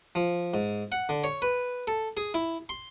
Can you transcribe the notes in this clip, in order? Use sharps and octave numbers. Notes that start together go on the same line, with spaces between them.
F3
G#2
F#5
D3
C#5
B4
A4
G#4
E4
C6